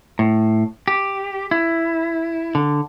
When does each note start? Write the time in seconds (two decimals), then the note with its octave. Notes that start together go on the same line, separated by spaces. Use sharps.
0.19 A2
0.88 G4
1.51 E4
2.55 D3